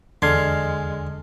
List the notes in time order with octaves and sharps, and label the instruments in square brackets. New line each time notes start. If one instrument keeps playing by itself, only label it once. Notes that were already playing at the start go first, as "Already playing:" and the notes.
[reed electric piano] E2 F6 [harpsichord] D3 [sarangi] G#3 [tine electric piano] C6 G#6 C7